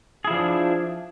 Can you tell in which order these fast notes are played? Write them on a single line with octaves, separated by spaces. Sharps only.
G#4 E4 F3 D4